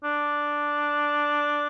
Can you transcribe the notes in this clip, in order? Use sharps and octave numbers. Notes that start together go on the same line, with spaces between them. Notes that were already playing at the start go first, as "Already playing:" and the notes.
D4